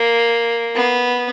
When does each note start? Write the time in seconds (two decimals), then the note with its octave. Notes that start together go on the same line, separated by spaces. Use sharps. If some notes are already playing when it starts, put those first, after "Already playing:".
Already playing: A#3
0.75 B3